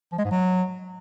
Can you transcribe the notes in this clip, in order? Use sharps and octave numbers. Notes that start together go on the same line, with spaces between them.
F3
G#3
G#2
F#3